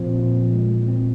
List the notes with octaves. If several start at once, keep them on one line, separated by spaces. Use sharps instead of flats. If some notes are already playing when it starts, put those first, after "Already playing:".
Already playing: A#2 F3 C4
A#2
G#3
C4